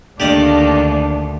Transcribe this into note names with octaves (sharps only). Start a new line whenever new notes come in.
D2 D#3 A3 A#3 D4 G4 D5 D#5